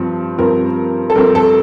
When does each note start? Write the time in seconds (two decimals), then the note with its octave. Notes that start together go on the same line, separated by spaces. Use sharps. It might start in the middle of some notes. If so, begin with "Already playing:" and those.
Already playing: G2 F3 C4
0.38 G2 F3 C4 A#4
1.10 A4
1.15 G2 F3 C4 A#4
1.35 A4